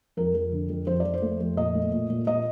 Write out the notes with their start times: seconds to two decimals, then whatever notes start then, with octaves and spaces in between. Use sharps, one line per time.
0.17 F2 A#4
0.34 F2
0.52 D3
0.70 F2
0.87 F2 C5
1.00 F2 D5
1.14 C5
1.22 A3
1.40 F2
1.57 A#2 D#5
1.75 A3
1.92 A#2
2.10 A#2
2.27 A#2 D#5